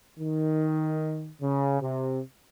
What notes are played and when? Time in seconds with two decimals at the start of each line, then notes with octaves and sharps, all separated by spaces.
0.19 D#3
1.41 C#3
1.82 C3